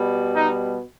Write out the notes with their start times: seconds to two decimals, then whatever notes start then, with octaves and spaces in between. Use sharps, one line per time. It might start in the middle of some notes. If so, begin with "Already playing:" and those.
Already playing: B2 G3
0.35 D#4